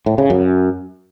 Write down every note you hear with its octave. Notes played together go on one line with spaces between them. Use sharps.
A2
C#3
F#2